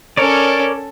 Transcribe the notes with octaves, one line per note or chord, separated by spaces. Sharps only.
C#4 A4 A#4 C#5 D5